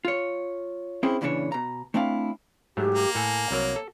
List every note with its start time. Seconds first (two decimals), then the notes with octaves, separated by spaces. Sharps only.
0.05 F4 C#5
1.03 C4 C#4 E4 G#4 C5
1.21 A#2 C#3 E3 G3 D4 C#5
1.52 B2 A#5
1.94 A3 C4 D4 E4 F5
2.77 G#2 F#3 A3 G4
2.95 A#3
3.15 A2 A4 G#5
3.51 C2 F#3 A#4 C#5
3.76 A4